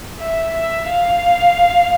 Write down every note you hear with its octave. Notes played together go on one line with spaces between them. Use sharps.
E5
E5
F5